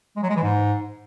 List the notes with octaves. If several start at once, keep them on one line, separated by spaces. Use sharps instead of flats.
G#3
F#3
G#3
E3
G#2